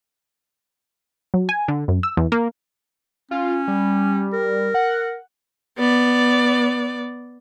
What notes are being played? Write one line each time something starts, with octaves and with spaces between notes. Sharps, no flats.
F#3
G#5
D3
F#2
E6
E2
A#3
C#4 F4
G3
A#4
F#5
B3 D5